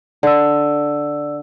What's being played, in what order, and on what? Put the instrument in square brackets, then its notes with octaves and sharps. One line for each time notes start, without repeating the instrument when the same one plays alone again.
[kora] D3 [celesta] D5 E6